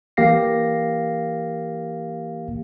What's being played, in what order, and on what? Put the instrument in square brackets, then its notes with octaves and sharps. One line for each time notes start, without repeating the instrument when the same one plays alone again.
[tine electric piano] E3 A#3 G4 F5 A#6 C7